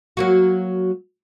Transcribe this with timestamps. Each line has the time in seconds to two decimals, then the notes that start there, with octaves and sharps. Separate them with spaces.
0.17 F#3 A#3 F#4